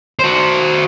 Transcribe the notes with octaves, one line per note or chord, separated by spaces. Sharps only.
F#4 C5